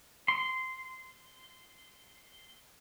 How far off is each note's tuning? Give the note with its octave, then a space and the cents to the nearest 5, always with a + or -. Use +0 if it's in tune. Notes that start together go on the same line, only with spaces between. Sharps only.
C6 -15